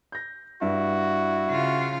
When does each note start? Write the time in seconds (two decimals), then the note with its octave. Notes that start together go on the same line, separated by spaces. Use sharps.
0.12 G6 A#6
0.62 G2 E4 F#4
1.49 C#3 F4